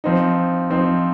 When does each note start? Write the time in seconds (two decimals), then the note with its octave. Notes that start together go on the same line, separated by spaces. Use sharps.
0.04 F3 C4 D#4
0.70 F3 C4 D#4